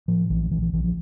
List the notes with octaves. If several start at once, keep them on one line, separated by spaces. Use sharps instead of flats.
A2 F3
A#1 E3
A#1 E3
E3
A#1 E3
F3